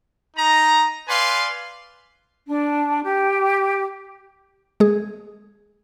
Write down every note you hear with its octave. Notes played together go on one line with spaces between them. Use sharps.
D#4 A#5
B4 D5 F5 G#5 C6
D4
G4
G#3 G#4